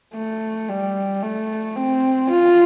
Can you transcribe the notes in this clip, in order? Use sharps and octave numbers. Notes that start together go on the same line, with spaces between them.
A3
G3
A3
C4
F4